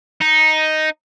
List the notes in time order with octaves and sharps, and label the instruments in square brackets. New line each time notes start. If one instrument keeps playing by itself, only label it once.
[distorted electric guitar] D#4